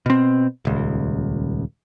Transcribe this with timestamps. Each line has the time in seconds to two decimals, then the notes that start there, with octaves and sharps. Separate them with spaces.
0.06 B2 C4
0.65 D#1 C#2